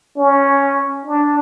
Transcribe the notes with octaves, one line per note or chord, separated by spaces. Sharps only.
C#4
D4